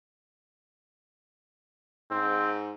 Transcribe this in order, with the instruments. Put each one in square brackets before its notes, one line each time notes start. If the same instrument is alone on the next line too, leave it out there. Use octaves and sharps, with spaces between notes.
[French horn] G#2 [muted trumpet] C4